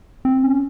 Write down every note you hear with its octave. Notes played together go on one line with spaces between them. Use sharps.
C4
C#4